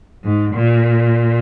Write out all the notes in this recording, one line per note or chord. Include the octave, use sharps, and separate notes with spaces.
G#2
A#2